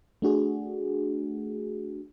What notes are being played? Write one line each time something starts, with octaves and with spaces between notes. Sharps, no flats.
A3 D4 F#4 G#4